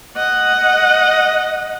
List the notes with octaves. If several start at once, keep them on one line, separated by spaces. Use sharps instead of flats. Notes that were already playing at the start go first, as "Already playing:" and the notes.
D#5 F#5